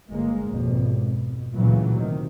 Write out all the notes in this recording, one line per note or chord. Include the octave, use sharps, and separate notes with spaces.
G1 G#3 A#3
G#1 F2 B2
B2
D2 A#2 C#3 E3 F#3
C3 D#3